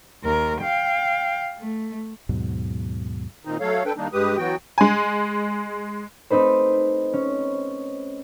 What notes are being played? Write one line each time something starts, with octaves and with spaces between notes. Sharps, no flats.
D#2 A#4
F5 G5
A3
D#2 G#2 B2 F#3
A#2 D#3 C4 D#4
F#3 A3 A4 C#5 F5
D4 A4 B4 G5
D#3 G3 A#3 D4 D#4
G2 G#3 G4 B4 D#6
E3 F#3 B3 F#4 G5
G#3 G#5
A3 C4 D#4 B4 C5
C#4